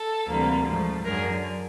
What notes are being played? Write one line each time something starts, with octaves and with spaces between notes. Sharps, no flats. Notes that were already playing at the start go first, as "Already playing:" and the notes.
Already playing: A4
D2 C3 E3 G3 A#3
G#2 F3 A3
F#2 D3 F#3 G#4 A#4